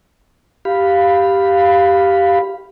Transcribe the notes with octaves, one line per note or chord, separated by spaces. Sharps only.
G4 F5 B5